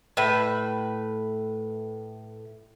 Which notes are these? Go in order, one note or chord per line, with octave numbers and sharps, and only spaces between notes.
A2 B4